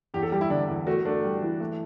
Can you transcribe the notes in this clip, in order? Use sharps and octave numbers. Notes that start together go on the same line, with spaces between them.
E2 G4
A4
G3 G4
E4
D3 D4
E2
A3 F#4
A3 D4
G3
E3
A3